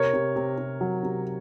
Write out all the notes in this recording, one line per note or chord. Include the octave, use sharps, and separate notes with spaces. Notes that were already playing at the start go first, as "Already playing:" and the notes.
Already playing: C3 A#4 C#5
C3
C3
C3
F#3
C3